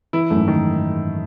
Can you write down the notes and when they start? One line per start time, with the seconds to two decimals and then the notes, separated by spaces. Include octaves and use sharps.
0.13 E3 E4
0.30 F#2 A3
0.37 G#2
0.48 D#3